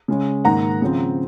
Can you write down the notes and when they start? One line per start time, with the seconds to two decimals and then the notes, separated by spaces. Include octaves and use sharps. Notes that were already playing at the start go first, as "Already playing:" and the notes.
0.08 C#3 G#3 C#4
0.44 G#2 D#3 A#3 F#5 A#5
0.82 C#3 F3 C4